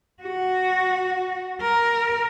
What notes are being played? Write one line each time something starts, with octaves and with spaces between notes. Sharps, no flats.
F#4
A#4